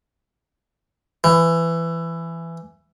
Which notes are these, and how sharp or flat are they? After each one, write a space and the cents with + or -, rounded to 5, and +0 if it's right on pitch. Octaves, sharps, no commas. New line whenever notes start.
E3 +15